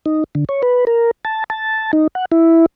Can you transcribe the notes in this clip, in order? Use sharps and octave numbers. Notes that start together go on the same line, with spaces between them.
D#4
D3
C#5
B4
A#4
A5
A5
D#4
F#5
E4